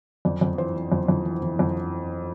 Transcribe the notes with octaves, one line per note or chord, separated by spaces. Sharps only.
F2 D5
F2
E3 C5
E3
F2
F2
E3
E3
F2